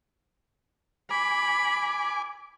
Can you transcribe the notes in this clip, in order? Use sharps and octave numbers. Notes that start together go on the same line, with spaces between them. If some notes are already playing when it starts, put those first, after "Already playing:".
G#5 B5 D6